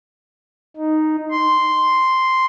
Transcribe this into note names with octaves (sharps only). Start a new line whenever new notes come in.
D#4
C6